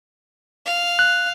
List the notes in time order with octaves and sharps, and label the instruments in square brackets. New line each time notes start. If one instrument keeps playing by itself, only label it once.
[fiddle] F5
[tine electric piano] F#6